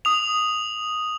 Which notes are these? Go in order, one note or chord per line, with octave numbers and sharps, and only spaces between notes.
D#6 F7